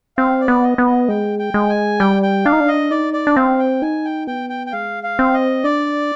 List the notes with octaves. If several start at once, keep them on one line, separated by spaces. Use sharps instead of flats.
C4 F5
D5
B3
D#5
B3
D#5
G#3 G5
G5
G#3
G#5
G3 G5
G5
D4 F5
D#4
D4
D#5
D#4 D5
D5
D4
C4 F5
G5
D#4 G#5
G5
B3 G5
G5
G5
G#3 F5
F5
C4
D#5
D4 D5